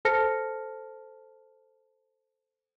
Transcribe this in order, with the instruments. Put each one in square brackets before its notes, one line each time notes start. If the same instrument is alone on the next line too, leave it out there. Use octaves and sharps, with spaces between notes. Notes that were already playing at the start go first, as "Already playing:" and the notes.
[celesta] A4 C5 A5 F6 A#6 C#7